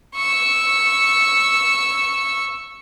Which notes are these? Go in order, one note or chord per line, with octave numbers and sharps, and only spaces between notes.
C#6 E6